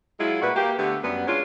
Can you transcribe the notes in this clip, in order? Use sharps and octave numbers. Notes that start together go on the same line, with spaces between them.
F#3 G#3 E4 F4
A#2 G3 F#4 B4 E5
A#3 G4
D3 A3 B3 G4
F#2 G3 B3
G#3 C#4 D4 F4